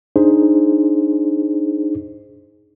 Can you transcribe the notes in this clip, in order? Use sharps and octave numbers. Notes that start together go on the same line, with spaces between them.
D4 D#4 G#4 C5